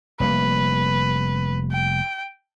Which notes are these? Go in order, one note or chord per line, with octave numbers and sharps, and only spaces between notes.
F1 G3 A#3 B4
G5